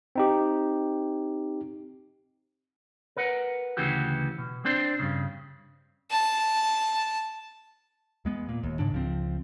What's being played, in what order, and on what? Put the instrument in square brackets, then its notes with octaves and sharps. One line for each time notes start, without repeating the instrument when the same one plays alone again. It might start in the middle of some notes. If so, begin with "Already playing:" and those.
[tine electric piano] C4 D#4 G4
[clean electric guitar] A#4 B4 F#5
D2 C#3 E3 F#4 G4
B2
C4 D4 C5
G2 C#3
[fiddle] A5
[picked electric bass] E2 G#3 B3
A#2
D#1 D#2
G#2 C#3 D4
C#2 F3 C4